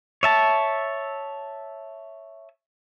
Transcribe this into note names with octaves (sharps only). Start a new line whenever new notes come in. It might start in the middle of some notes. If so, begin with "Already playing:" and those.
C#5 E5 A5